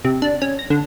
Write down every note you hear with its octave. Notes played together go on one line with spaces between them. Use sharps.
C3
D4
C#4
A#6
D3